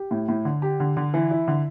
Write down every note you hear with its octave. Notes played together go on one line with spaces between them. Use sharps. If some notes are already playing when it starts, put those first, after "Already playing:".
Already playing: G4
A2
A2
D3
G4
D3
D3
E3
E4
D3